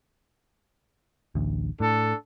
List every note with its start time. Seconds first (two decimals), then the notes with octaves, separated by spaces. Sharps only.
1.35 A1 D2
1.80 A2 D4 A4